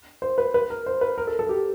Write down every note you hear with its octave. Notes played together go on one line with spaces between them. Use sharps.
C5
B4
B4
A#4
C5
B4
A#4
A4
A4
G4